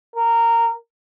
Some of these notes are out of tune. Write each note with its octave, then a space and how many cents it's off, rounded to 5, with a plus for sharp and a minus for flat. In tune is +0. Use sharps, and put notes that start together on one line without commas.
A#4 -15